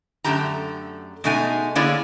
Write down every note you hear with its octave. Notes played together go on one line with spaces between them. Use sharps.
F#2 D3 E3 A3 G4 A#5
B2 G#3 A3 D#4 G#5
D3 A#3 E4 G#4 C#5 D5